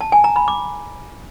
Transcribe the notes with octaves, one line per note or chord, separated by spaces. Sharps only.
A5
G#5
A#5
B5
D6